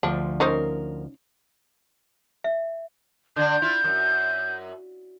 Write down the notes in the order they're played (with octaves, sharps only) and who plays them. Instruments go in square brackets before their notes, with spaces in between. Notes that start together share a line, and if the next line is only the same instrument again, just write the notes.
[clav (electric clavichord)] D2 F3 [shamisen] D4
[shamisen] C#4 D#4 C5 [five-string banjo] A#4
[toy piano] E5
[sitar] D3 D4 [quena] G6
[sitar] E4 F4
F#2